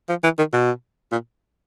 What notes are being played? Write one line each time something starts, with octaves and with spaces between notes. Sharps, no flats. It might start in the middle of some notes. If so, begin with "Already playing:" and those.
F3
E3
D#3
B2
A#2